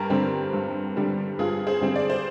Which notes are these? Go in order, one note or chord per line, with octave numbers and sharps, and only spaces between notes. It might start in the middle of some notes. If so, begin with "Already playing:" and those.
Already playing: G2 G4 A#4
D3 G3 C4
G2
D3 G3 C4
G2 F4 G#4
G#4 C5
D3 G3 C4
D5
C5